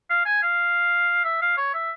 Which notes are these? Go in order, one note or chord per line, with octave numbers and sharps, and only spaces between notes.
F5
G#5
F5
E5
F5
C#5
E5